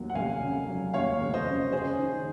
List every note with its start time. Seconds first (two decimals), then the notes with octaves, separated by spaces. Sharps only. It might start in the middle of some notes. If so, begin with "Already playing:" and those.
Already playing: D#2 F#3
0.10 F#5
0.15 F1 F5 G#5
0.41 C#3
0.68 F#3
0.93 D#2 C#5 F5
1.21 F1
1.34 C5 D#5
1.47 C#3
1.72 C#4 G#4 C5
1.99 D#3